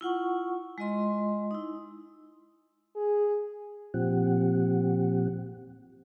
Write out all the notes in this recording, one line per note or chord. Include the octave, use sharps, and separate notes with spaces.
E4 F4 F#5 C#6
G#3 F4 D#5 C6
D#4 E4
G#4
A#2 F3 C4 G4 F#5